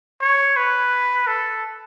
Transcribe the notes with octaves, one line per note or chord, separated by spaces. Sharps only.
C#5
B4
A4